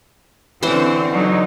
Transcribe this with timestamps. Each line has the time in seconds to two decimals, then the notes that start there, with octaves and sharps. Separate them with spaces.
0.63 D3 E3 C4 C#4 C5
1.11 D3 F#3 D#4